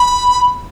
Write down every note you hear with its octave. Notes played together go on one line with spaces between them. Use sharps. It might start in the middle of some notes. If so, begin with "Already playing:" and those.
Already playing: B5